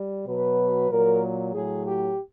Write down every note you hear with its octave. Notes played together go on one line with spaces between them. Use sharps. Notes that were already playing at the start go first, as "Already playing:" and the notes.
Already playing: G3
B2 F#3 B4
A#2 F#3 A#4
A2 F#3 G#4
G4